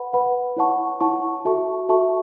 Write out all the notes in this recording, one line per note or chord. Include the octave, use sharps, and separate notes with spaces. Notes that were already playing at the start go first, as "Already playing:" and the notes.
Already playing: B4 F#5 B5
B4 F#5 B5
E4 C#5 F#5 A5 C#6
E4 C#5 F#5 A5 C#6
F#4 A4 E5 A5 C#6
F#4 A4 E5 A5 C#6